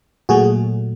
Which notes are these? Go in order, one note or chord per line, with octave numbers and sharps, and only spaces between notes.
A#2 F#3 A3 F#4 G#4